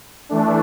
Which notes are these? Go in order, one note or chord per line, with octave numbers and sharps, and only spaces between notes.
E3 A3 D4